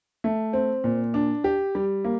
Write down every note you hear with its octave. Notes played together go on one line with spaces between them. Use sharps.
A3
C4
A#2
D4
G4
G3
A#3